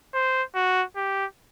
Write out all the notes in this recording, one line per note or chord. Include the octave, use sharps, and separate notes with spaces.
C5
F#4
G4